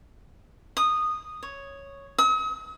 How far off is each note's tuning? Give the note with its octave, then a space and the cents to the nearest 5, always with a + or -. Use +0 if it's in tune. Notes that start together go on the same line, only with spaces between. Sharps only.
D#6 -10
C#5 +0
D#6 +45